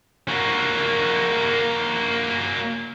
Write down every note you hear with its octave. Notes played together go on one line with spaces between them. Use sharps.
A#3 F#4